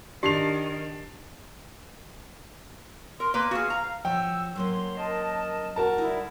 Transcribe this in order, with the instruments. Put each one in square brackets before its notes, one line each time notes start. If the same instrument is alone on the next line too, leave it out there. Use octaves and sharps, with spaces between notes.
[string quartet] D#3 [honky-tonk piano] D4 C7 F7 [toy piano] G4
[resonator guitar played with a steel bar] A#4 [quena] C6
[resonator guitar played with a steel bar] A#3 B4
[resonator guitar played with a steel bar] F#4 G#4 [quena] F5
[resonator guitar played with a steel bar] A#5
[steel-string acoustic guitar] F3 F#4 C#5 [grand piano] G5 [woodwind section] E6
[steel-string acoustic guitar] F#3 A#3 C#4 [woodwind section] C6
[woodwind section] A#4 D#5 A5
[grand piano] F#4 A#4 A5
[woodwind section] D3 G3 E4 [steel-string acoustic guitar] D#4